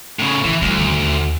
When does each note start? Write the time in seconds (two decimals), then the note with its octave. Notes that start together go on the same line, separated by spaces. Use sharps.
0.19 A2 C#3
0.44 C#3 E3
0.62 D2 G3
0.80 D#2